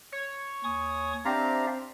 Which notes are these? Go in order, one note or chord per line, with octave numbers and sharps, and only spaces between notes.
C#5
D#2 G#5 C#6 D#6
C4 D4 G4 D5 E5 F5 A#5